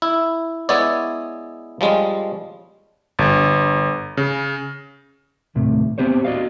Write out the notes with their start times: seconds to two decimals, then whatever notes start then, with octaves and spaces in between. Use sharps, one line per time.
0.02 E4
0.69 G#3 B3 E4 C#5 D5
1.81 F3 G3 G#3 C#4
3.19 G1
4.17 C#3
5.55 D#2 A2 C3
5.98 B3 C4 G4 C5 C#5
6.25 F#4 D5 D#5 F5